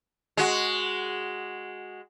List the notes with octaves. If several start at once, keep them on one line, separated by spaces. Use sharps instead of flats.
G#3 F#4